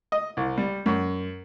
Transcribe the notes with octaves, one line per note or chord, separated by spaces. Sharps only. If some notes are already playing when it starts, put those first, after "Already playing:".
D#5
C2
G3
F#2